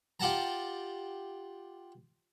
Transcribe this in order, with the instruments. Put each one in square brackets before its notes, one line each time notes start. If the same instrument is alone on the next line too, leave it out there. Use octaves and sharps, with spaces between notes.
[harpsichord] F4 G4 F#5 A5 A#5